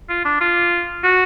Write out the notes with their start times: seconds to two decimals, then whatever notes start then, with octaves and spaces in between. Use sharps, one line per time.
0.09 F4
0.25 D4
0.41 F4
1.04 F#4